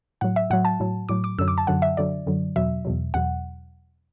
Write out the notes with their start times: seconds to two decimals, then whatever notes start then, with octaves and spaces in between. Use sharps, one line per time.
0.21 A2 F#3 F#5
0.36 E5
0.50 A2 F#3 F#5
0.65 A5
0.80 A2 F#3
1.09 A2 F#3 D6
1.24 D6
1.38 F#2 D3 F#3 E6
1.48 D6
1.58 A5
1.67 F#2 D3 F#3 F#5
1.82 E5
1.97 F#2 D3 F#3 D5
2.26 F#2 D3 F#3
2.56 E2 B2 F#3 E5
2.85 E2 B2 F#3
3.14 E2 B2 F#3 F#5